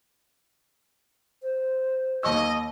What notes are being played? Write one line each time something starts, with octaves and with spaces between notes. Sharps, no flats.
C5
D#2 D#5 C#6 E6